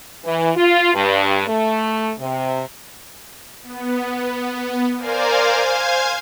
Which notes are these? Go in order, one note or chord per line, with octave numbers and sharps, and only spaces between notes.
E3
F4
G2
A3
C3
B3
A#4 C5 D5 F5 G#5
C5 F5 G#5 G#6